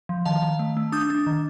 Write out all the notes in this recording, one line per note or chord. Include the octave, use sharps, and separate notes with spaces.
F3
D#3 F5 A5
D#3
A3
A3
D4 D#6 G6
D4
D#3